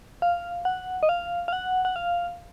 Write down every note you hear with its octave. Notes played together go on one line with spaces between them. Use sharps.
F5
F#5
D#5
F5
F5
F#5
F#5
F5